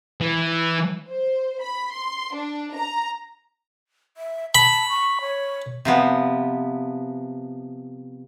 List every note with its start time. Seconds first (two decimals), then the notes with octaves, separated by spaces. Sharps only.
0.21 E3
1.10 C5
1.61 B5
1.93 C6
2.35 D4
2.76 A#5
4.17 E5
4.55 A5 B5
4.89 C#6
5.21 C#5
5.85 C3 F3 B3